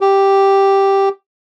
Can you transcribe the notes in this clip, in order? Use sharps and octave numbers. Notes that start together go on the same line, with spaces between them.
G4